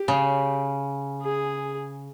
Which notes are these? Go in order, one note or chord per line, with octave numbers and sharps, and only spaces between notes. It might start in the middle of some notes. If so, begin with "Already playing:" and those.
Already playing: G4
C#3
G#4